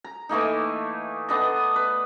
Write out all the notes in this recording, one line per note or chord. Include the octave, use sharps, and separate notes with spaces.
A#5
E3 A3 A#3 D#4
B3 D4 A4 D#5
B4